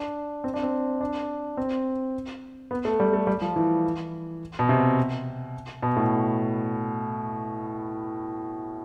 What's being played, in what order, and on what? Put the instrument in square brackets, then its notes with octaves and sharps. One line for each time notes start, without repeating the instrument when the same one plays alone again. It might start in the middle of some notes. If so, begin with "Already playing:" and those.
Already playing: [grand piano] D4
C4
D4
C4
D4
C4
B3
A3
G3
A3
G3
F3
E3
B2
C3
B2
A2